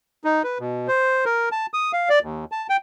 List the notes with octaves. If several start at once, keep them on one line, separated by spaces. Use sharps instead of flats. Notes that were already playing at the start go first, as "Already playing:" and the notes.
D#4
B4
B2
C5
A#4
A5
D#6
F5
D5
D#2
A5
G5